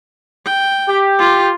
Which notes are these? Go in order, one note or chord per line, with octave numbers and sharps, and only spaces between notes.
G5
G4
F4